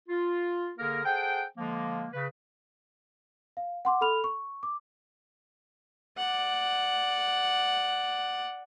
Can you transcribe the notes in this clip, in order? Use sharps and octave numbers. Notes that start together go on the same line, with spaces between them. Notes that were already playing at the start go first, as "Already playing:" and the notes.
F4
D3 A#3 G#4 A#4
G#4 A4 C5 F#5 G5
D3 F3 G#3 A#3
C#3 B4
F5
F#5 C6 D6
A4 B5 F6 F7
C#6
D6
D5 F#5